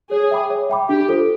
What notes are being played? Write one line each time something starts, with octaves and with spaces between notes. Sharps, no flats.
G#4 C#5
E5 G5 B5 D6
C#5
E5 G5 B5 D6
D4 G4
F4 A4 C5